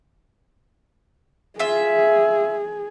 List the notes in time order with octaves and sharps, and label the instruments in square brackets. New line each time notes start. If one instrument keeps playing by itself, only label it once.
[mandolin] F4 E5 [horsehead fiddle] G#4